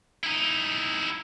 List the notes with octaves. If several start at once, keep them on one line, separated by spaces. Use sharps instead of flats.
D#4 E4